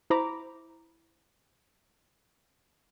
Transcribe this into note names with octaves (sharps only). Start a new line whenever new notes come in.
E4 C5 A#5 B5 D6